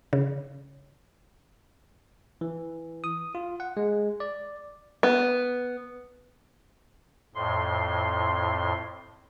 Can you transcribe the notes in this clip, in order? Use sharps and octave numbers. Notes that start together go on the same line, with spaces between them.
C#3
E3
D#6
F4
F#5
G#3
D5
B3
F2 A2 C6